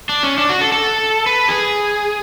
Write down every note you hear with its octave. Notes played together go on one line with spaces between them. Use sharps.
D4
C#4
D4
F#4
A4
A4
B4
G#4